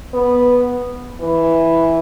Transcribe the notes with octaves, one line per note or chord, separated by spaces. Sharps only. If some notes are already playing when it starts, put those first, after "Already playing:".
B3
E3